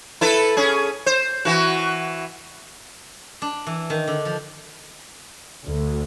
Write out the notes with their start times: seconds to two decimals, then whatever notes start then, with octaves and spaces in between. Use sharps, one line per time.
0.21 E4 A4 B4
0.57 C#4 G#4
1.06 C5
1.45 E3 F#4
3.42 D4
3.67 E3
3.90 D#3
4.07 D3
4.25 F3
5.65 D2